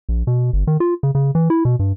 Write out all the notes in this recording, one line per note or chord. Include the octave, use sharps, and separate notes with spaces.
A#1
B2
G1
D#3
F4
C#3
C#3
E3
E4
B2
G2